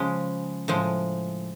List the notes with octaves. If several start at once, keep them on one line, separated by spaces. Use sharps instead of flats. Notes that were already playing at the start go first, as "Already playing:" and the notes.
Already playing: C#3 F3 G#3
A2 F3 G#3